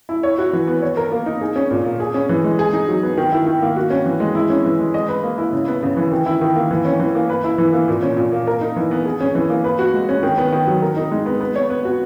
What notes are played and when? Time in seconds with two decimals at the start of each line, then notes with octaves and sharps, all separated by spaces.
0.09 E4
0.23 C#5
0.38 F#4
0.53 E3
0.67 B3
0.82 C#5
0.97 A#4
1.12 A#3
1.26 D#4
1.41 G#4
1.56 C#4
1.71 A#2
1.85 A#3
2.00 G#4
2.14 C#4
2.29 E3
2.44 G#3
2.59 G#4
2.73 D#4
2.88 F#3
3.03 B3
3.17 D#3
3.32 E4
3.46 D#3
3.62 A#3
3.76 F#4
3.90 C#4
4.06 E3
4.20 G#3
4.35 E4
4.50 C#4
4.65 E3
4.79 G#3
4.94 D#5
5.09 B4
5.23 A#3
5.38 E4
5.53 C#3
5.68 B3
5.83 C#3
5.97 E3
6.12 D#3
6.26 E4
6.41 D#3
6.56 A#3
6.71 E3
6.85 C#4
7.00 E3
7.15 A#3
7.29 B4
7.44 E4
7.58 E3
7.73 A#3
7.88 A#2
8.03 C#4
8.17 A#2
8.32 A#3
8.47 A#4
8.61 D#4
8.76 E3
8.91 B3
9.05 G#4
9.21 C#4
9.35 E3
9.49 A#3
9.64 B4
9.79 F#4
9.94 G#3
10.09 C#4
10.23 D#3
10.38 B3
10.52 D#3
10.67 F#3
10.82 A#4
10.97 D#4
11.11 G#3
11.26 B3
11.41 B3
11.56 C#5
11.70 B3
11.85 F#4